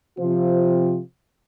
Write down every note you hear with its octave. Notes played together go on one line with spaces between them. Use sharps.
C3 F3 C4 F4 C5